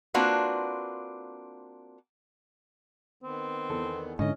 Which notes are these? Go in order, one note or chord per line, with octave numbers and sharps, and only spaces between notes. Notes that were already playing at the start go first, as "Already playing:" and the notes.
A#3 C4 D4 F4 F#4 B4
D#3 B3 C4
E2 A4
G#2 D3 C#4 E4 D#5